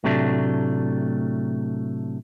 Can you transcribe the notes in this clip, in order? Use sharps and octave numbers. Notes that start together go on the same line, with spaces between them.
A2 C3 F#3 A3 C#4 D4